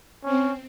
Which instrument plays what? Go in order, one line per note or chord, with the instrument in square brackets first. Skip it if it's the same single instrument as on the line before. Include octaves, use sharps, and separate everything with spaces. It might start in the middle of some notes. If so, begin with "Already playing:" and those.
[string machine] C4 [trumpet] C#4